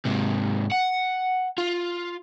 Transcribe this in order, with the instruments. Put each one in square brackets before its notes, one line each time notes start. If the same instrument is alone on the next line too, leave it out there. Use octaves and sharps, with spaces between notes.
[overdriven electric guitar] G#2 C3
F#5
F4